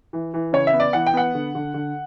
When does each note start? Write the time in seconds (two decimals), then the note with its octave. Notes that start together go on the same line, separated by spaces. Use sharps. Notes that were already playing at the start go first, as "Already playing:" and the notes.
0.13 E3
0.34 E3
0.53 C#3 C#5
0.67 E5
0.73 B3
0.80 D5
0.93 E3 F#5
1.06 G5
1.14 B3 F#5
1.35 D3
1.55 D3
1.74 D3